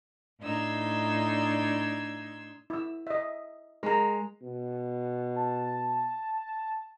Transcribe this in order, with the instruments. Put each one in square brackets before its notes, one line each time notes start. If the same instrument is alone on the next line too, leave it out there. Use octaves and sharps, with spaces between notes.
[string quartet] A2 D4 D#4 C6 E6 G#6
[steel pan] E4 E6
D#5 E5
[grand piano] G#3 [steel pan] A#4 A#5
[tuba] B2
[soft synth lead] A5